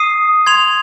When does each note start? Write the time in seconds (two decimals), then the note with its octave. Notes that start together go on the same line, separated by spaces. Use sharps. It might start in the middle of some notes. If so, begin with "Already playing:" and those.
Already playing: D#6 C7 D#7
0.46 C6 G#6 F7